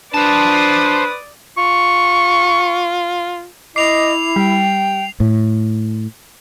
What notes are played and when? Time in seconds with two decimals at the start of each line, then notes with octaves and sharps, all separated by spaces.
0.14 D4 B4 C5 D5 A5 D#6
1.58 F4 C#6
3.76 E4 D#5 D6 C7 F7
4.36 G3 G5
5.20 A2